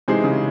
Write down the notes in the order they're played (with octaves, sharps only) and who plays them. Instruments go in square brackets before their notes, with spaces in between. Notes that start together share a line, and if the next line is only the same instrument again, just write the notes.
[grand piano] C3 [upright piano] E3 G#3 D#4 G#4 C5
[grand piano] C#3